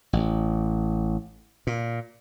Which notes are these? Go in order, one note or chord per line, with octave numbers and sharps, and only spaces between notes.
A1
A#2